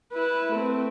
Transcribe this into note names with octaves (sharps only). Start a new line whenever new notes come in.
E4 B4
A3 C4